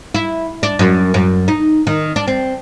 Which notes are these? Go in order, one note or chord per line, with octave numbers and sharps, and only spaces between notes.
E4
D4
F#2
F#2
D#4
D#3
D4
C4